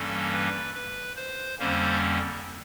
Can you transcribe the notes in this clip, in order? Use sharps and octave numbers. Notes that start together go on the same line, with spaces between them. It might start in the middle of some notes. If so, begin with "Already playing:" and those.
Already playing: G2 E3 G3 A#3 C#4 A4
B4
B4
C5
F2 D3 G3 A#3 C#4 C5